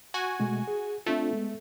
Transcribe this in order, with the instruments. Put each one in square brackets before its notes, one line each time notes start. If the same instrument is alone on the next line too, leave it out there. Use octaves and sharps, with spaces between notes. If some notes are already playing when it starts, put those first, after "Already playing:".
[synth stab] F#4 G#5
[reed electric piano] B2 G#3 A3
G#4
[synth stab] A3 [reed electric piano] C4 D4 F4
[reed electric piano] G#3 B3